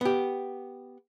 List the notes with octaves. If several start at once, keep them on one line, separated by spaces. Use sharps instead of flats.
B3 G4